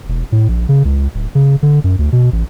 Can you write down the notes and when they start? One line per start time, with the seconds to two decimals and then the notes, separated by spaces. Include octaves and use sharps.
0.08 E1
0.32 A2
0.49 A#1
0.69 C#3
0.85 C#2
1.14 D1
1.35 C#3
1.63 D3
1.84 F#2
1.99 D2
2.12 B2
2.33 A1